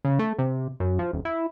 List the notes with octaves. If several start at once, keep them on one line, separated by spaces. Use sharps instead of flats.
C#3
A3
C3
F#2
F3
D#1
E4